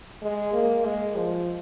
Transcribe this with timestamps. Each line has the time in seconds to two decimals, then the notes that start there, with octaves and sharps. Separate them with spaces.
0.22 G#3
0.53 A#3
0.85 G#3
1.16 F3